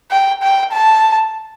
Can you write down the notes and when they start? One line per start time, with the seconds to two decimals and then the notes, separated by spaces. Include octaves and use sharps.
0.11 G5
0.42 G5
0.72 A5